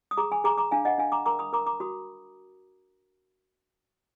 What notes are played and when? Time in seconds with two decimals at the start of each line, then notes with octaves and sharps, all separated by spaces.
0.11 D#6
0.17 G#4 A#5 D6
0.32 G#5 B5
0.44 G#4 A#5 D6
0.58 A#5 D6
0.71 D4 F5 G#5
0.85 D#5 F#5
0.98 D4 F5 G#5
1.12 A#5 D6
1.26 A#4 A#5 D6
1.39 B5 D#6
1.53 A#4 A#5 D6
1.66 A#5 D6
1.80 F#4 B5 D#6